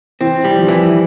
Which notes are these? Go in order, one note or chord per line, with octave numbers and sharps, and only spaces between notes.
E3 C4
G3
F3
E3